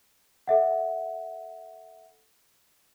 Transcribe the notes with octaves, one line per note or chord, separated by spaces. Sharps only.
A4 E5 F#5